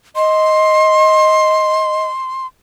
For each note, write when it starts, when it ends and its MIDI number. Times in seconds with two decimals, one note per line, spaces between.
0.16 2.06 75
0.16 2.47 84